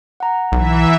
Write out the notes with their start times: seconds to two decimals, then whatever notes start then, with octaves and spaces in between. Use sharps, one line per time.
0.20 F#5 A#5
0.52 B1 E3 E5